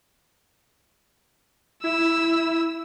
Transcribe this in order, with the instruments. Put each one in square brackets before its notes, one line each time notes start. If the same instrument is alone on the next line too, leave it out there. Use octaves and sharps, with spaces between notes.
[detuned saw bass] E4 [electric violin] E6